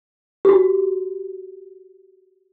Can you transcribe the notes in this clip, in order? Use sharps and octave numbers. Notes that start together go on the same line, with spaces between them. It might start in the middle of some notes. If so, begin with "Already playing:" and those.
F#4 G4